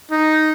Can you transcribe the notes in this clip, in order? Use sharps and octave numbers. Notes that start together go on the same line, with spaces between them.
D#4